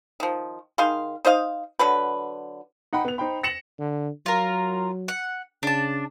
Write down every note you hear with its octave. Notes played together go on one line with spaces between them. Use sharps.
D#3 F3
D#3 G#4 F5 C6
D#4 C5 D#5 F5
D3 F#3 B4
D#4 F#5 G5 B5
B3 F7
D#4 C5 G5 B5
A#6 C#7 E7 F#7
D3
F#3 F4 A#4
F#5
C#3 D4 A5